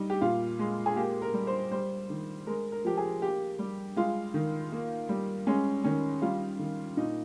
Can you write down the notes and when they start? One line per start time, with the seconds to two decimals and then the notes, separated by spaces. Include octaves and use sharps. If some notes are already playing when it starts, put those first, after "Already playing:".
Already playing: G3 D#4
0.10 G4
0.21 A#2 F4
0.59 G#3
0.86 G#4
0.96 A#3 G4
1.22 A#4
1.34 G3
1.47 C5
1.72 G3 C5
2.10 D#3
2.47 G#3 A#4
2.72 A#4
2.85 F3 G4
2.97 G#4
3.22 A#3 G4
3.59 G3
3.96 G#3 F4
4.34 D#3
4.72 A#3
5.09 G3
5.47 G#3 C#4
5.84 D#3 C#4
6.22 G3 F4
6.59 D#3
6.97 A#2 D#4